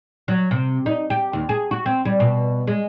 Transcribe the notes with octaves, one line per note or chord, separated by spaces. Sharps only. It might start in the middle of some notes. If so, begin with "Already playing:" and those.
F#3
C3
D#4
G4
D#2
G#4
F#4
C4
G3
B2
G#3